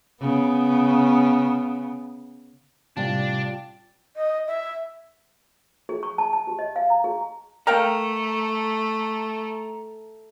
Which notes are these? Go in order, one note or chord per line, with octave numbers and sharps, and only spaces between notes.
C#3 B3
A2 C3 G3 D4 F4 G4 A6
D#5
E5
G#4
C#6
A5
A5
G4
D#5
F5
A#5
G#4
A3 A#4 F5 G5 A#5